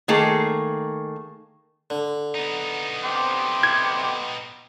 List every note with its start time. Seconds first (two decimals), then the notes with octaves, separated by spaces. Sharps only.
0.08 D#3 A3 A#3 G#4
1.90 D3
2.35 B3 D#4
3.04 G5 C6 D6
3.63 G#6